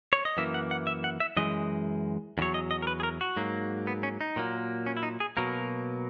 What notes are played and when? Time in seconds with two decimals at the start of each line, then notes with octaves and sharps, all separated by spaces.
0.13 C#5
0.25 D#5
0.37 F#2 E3 A#3 E5
0.54 F#5
0.71 F#5
0.87 E5
1.04 F#5
1.20 E5
1.37 F#2 E3 G#3 D#5
2.38 E2 C#3
2.42 F#3 C#5
2.54 D#5
2.71 D#5
2.83 A#4
2.87 B4
3.00 G#4
3.03 A#4
3.21 F#4
3.37 G#2 F#3 A#3
3.87 B3
4.03 C#4
4.21 D#4
4.36 A#2 F#3 A#3
4.86 C#4
4.97 E4
5.03 D#4
5.20 G#4
5.37 B2 F#3 A#3 A#4